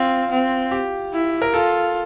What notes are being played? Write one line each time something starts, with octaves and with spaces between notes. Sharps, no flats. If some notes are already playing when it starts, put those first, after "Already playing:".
Already playing: C4 F4
C4
G4
E4
A#4
F4 A4